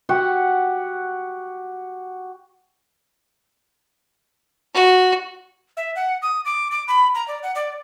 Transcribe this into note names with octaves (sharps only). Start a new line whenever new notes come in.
F#4 G4 F#5
F#4
E5
F#5
D#6
D6
D6
B5
A#5
D5
F#5
D5